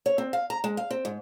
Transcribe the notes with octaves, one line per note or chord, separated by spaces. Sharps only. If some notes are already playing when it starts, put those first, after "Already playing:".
C#5
C4
F5
A#5
G#3
F5
C4
G#2